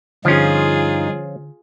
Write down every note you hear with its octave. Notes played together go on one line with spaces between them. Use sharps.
G2 D3 F3 C#4 D#4 F4 G#4